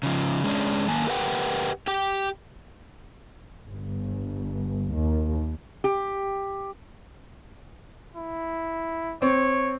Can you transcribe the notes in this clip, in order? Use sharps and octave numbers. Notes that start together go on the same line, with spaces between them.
C#3 F3
G#3 C#4 D4
D#3 A#3 G#5 A5
G4 A#4 B4 E5 F#5 G5
G4 G5
G1
D#2
G4
E4
C4 C#5